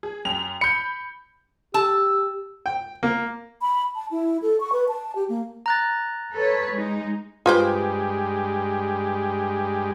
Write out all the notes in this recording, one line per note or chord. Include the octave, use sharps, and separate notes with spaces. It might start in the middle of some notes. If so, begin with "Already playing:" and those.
G#4
F#2 G5 F7
B5 G6 C#7
G4 A5 E6
G5
A#3
B5
A5
E4
A4
C#6
B4
A5
G4
A#3
A#5 F#6 A6
A4 B4 C#5
G#3 D#4
G2 G#3 F4 G4 B4 C5